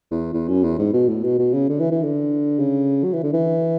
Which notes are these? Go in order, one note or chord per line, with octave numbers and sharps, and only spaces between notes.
E2
E2
F#2
E2
G#2
B2
A2
B2
B2
C#3
D3
E3
E3
D3
C#3
F#3
E3
D3
E3